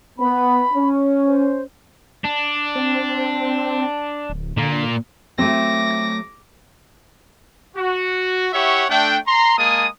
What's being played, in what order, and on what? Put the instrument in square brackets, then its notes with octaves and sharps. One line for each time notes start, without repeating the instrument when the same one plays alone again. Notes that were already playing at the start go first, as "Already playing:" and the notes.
[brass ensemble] B3 [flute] B5
[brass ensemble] C#4
[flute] C5
[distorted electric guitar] D4
[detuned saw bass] C4
D1
[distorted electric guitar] A#2 A#3 [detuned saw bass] D3
[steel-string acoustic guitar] F#3 A3 [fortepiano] C4 [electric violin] D6 A#6
[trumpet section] F#4
E4 G4 C#5 E5 F#5 C#6
A3 D4 G5
A#5 C6
G#3 A#3 G#4 A5 D#6